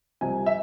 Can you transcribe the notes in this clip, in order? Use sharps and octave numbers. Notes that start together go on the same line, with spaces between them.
C2 C3 F3 G#5
E5